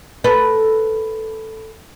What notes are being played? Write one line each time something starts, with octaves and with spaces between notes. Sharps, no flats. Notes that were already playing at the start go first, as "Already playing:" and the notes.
A4 B4